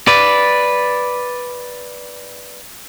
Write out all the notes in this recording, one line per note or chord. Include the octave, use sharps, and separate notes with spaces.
B4 D5